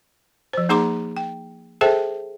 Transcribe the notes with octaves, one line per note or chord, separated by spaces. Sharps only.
F3 C5
A#3 D#4 G#4 A#5 C6 D6
G5
G#4 A4 C5 E5 G5 A5